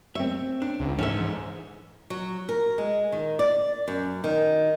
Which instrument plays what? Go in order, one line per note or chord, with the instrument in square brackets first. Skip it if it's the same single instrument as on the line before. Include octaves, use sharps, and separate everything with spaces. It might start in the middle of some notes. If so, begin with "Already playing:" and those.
[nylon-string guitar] C4 C#5 [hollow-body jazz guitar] E5
[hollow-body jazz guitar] D4
[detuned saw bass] C#2
[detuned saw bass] G#2 [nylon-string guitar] E3 [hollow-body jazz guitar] C#4 A4 E5
[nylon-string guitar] F#3
A#4
G#3
D#3
D5
F#2
D#3